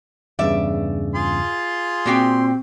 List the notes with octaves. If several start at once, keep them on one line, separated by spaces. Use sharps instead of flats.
E2 G2 C#3 D5 E5
F4 G#4 C6
A#2 C4 F#4 G4 G5 C7